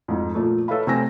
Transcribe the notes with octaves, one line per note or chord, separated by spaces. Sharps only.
F2 G#2
A#2 F3 A3
A4 B4 C#5 E5 F5 B5
C3 A3 C4 G#5 A#6